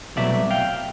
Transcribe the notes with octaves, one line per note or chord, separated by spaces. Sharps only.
C2 B2 F#3 A3 D5 E5
F5 G5